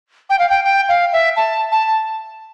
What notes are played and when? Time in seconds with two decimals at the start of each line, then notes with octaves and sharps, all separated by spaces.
0.30 G5
0.39 F5
0.50 G5
0.65 G5
0.89 F5
1.13 E5
1.36 A5
1.72 A5